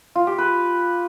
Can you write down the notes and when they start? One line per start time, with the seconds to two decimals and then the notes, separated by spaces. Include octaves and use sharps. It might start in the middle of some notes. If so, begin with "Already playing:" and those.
0.15 F4
0.27 G4
0.38 B4